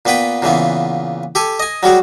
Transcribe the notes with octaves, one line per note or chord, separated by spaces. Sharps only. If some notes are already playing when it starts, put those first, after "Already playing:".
A#2 B3 B4 G5
A#2 C#3 E3 B3
G4 A4 G#5
D#5 G#5
F#3 G3 F#4 G#4